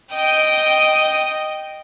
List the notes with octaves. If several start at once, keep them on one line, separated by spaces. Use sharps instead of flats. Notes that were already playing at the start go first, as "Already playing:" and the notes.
D#5 G5